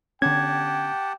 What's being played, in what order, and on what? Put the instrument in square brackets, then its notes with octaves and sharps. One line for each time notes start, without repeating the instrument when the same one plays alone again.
[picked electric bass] D3 B3 C#4 [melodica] G4 F#5 A5 [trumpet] G5 [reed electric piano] G#6